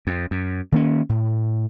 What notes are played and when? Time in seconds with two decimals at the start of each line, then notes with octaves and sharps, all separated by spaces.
0.07 F2
0.31 F#2
0.72 D#3 A#3 C#4
1.09 A2